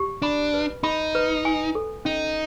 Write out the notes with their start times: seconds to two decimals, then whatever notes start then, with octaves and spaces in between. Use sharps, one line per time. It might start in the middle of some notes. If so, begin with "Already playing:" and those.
Already playing: G4
0.22 D4 B5
0.54 B4
0.83 D#4 B5
1.15 B4
1.45 G#5
1.75 A4
2.05 C#4 D#4